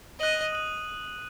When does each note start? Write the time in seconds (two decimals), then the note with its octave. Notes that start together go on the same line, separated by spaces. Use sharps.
0.20 D#5 D#6 F#6 D#7 F#7
0.52 D#6 F#6 D#7 F#7